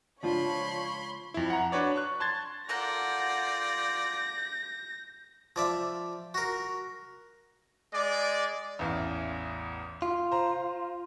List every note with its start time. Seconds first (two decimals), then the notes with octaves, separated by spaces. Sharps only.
0.23 C#2 F3 D4 F4 C#5 B5 C6
1.34 F2 E4
1.50 F#5 A#5
1.72 D4 F#4 B4 C#5 D5
1.96 C#6 F#6
2.20 A5 C6 G#6 A6
2.69 F4 A4 A#4 D5 F#5 G6 A#6
5.56 F3 D5 E5
6.34 F#4 A#4
7.93 G#3 D5
8.79 A1 E2 F5
10.02 F4
10.32 C5 A#5